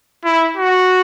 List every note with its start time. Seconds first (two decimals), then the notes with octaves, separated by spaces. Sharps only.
0.25 E4
0.57 F#4